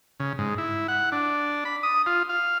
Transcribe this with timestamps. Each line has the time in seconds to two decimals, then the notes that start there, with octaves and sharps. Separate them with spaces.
0.20 C#3
0.39 G#2
0.58 E4
0.88 F#5
1.12 D4
1.65 B5
1.83 D#6
2.06 F4
2.29 F5